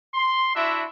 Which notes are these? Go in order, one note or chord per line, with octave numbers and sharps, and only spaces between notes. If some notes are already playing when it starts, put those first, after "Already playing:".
C6
D4 E4 F#4 E5